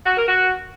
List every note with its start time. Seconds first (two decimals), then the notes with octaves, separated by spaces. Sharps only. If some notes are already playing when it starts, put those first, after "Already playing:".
0.05 F#4
0.16 A#4
0.28 F#4